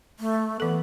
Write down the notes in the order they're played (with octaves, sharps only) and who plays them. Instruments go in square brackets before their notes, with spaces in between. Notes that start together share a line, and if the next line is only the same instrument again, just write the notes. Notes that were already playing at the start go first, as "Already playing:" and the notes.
[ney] A3
[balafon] E3 A4 [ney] B3